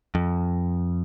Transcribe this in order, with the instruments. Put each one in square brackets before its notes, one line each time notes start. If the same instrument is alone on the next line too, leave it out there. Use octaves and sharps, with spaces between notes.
[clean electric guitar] F2